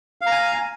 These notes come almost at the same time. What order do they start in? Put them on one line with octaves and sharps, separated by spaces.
F5 A#5 G#5